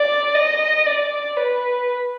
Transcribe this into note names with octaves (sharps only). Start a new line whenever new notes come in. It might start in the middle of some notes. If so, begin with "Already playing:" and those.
Already playing: D5
D#5
D5
B4